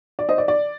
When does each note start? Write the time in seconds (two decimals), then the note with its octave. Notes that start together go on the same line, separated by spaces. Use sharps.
0.19 D5
0.29 C5 D#5
0.38 D5
0.48 D5